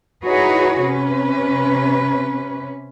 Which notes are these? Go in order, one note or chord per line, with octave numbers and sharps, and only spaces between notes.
D#4 E4 F#4 G#4 B4 C#5
C3 C#4 B4